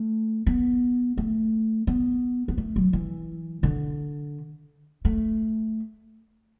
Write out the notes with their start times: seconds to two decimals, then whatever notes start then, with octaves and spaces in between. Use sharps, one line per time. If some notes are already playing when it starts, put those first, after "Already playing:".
Already playing: A3
0.46 B3
1.18 A3
1.87 B3
2.48 B3
2.58 A3
2.76 F#3
2.93 E3
3.63 D3
5.05 A3